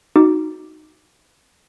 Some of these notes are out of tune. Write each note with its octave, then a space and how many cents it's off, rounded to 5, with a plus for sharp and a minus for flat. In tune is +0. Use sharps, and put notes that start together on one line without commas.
D#4 +0 F#4 +0 D6 +0